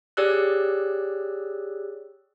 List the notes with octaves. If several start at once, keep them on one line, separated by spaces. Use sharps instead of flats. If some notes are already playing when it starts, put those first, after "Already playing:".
G4 G#4 C#5 D5 E6 F#6